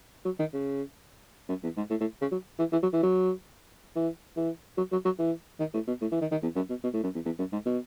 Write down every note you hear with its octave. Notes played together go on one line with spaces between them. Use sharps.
F#3
D#3
C#3
F#2
E2
G#2
A2
A2
C#3
F#3
E3
E3
F#3
E3
F#3
E3
E3
F#3
F#3
F#3
E3
D#3
A2
B2
A2
E3
D#3
D#3
E2
F#2
B2
B2
A2
F#2
E2
E2
F#2
G#2
B2